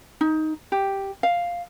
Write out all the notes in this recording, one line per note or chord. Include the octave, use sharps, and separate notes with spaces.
D#4
G4
F5